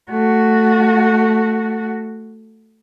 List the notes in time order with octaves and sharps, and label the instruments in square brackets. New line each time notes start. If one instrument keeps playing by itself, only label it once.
[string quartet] A3 F#4